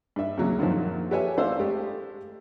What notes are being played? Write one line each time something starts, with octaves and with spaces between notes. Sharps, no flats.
G2 E5
D#2 C#3 F#3
F#2 A#2 D3 D#3 F3 F#3
G4 A4 B4 C#5 E5 G#5
A1 D4 C5 F5 E6
G#3 A3 G4 G#4